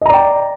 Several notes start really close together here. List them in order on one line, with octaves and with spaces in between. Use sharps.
D#5 A#5 D5 G5